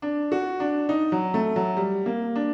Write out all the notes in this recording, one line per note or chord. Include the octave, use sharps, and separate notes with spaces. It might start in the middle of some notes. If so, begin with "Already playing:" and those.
D4
F#4
D4
D#4
F#3
A3
F#3
G3
A#3
D4